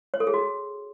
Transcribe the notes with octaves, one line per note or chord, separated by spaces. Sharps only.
C#5
A4
G#4
F#4